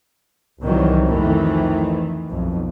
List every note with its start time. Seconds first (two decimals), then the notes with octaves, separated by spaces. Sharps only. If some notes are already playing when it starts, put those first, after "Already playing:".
0.63 C2 C3 D#3 E3 F#3
1.05 F2 D#3 E3 A3
2.30 B1 F2